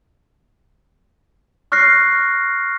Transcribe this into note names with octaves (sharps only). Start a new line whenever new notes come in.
C#6 F6 F#6 A#6 C7